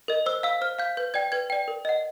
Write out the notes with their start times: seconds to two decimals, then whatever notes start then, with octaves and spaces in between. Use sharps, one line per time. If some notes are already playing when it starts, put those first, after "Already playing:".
0.08 A#4 D#5
0.26 C5 E6
0.43 F5 E6
0.61 C5 F6
0.79 F5 G6
0.97 B4 G6
1.14 D5 G5 G#6
1.32 B4 G#6
1.50 D5 G5
1.68 A#4
1.85 D#5 F#5